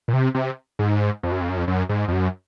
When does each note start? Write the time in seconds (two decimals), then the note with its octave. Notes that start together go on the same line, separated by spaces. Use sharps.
0.08 A#2
0.13 C3
0.35 C3
0.79 G#2
1.23 F2
1.32 F#2
1.41 F2
1.49 F#2
1.57 F2
1.67 F#2
1.89 G#2
2.08 F2
2.12 F#2